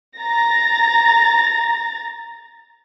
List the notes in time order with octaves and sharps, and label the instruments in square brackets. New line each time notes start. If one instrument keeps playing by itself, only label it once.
[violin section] A#5 A6 A#6